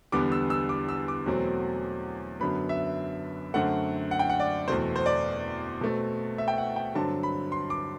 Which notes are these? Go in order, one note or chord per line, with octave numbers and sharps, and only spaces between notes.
E2 D3 G3 B3 D6
E6
E6
D6
E6
D6
E2 B2 F#3 A3 C4
F#2 D3 F#3 B3 B5
E5
F#2 D3 A3 C4 F#5
F#5
G5
F#5
D5
E2 B2 A3 C4 C5
C5
D5
B2 A3 C4
E5
G5
F#5
G5
G2 D3 F#3 C4 A5
B5
C6
D6